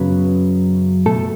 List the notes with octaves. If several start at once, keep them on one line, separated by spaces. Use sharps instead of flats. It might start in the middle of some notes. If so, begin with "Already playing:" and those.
Already playing: F#2 C#3 F#3 B3 B4
B2 A3 A4